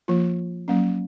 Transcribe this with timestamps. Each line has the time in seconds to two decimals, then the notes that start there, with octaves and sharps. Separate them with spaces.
0.08 F3 A#3 F4
0.68 F#3 A#3 C#4